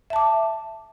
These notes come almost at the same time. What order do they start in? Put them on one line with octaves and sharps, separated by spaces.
E5 A5 D6